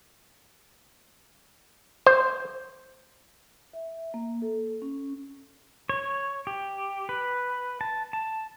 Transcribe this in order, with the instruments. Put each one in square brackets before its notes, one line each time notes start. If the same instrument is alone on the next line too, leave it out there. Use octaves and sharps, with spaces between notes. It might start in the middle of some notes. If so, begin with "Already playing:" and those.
[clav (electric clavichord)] C5
[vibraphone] E5
A#3
A4
C#4
[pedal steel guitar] C#5
G4
B4
A5
A5